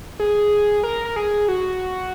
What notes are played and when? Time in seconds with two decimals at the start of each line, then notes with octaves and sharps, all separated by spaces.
0.20 G#4
0.83 A#4
1.05 A#4
1.16 G#4
1.48 F#4